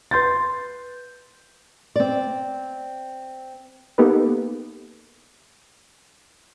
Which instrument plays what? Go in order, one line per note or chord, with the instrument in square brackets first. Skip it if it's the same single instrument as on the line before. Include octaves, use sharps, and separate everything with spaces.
[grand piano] B4 C6 G6 A6
[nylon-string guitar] C4 D5
[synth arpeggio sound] A#3 B3 D#4 G4 A4 B4